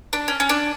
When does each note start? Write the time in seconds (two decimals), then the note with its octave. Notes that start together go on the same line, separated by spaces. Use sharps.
0.13 D4
0.28 C#4
0.40 C#4
0.49 D4